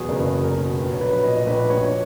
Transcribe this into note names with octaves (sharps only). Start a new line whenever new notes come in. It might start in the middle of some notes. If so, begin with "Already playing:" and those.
Already playing: E2 B2 F#3 G#4 B4
F#1 A#4
F#3
A#4
B2
A#1 B4
C#5
F#3 B4
A#2 D#5
A#1 B4
A#1 C#5